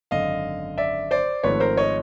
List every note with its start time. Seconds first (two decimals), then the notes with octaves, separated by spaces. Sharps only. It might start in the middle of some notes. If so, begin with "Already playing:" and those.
0.11 G#1 F#2 D3 D#5 F5
0.78 D5 E5
1.11 C5 D5
1.44 G#1 G#2 F3 A3 B4 C#5
1.60 A#4 C5
1.77 C#5 D#5